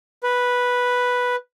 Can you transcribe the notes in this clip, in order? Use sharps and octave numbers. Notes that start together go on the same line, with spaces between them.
B4